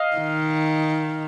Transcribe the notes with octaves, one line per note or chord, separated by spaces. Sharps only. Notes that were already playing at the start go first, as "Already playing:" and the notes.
Already playing: D#5 F5
D#3